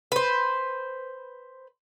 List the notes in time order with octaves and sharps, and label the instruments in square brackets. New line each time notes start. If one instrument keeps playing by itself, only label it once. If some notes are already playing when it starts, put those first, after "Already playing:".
[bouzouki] B4 C5